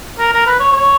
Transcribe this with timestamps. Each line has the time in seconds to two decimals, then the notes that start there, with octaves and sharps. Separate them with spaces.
0.19 A#4
0.32 A#4
0.46 B4
0.60 C#5
0.72 C#5